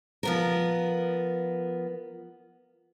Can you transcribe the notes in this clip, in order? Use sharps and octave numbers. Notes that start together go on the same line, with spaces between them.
F3 B3 A#4